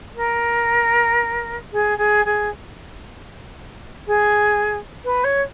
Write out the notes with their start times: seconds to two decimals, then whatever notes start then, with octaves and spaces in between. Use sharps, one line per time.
0.15 A#4
1.72 G#4
1.97 G#4
2.25 G#4
4.06 G#4
5.04 B4
5.24 C#5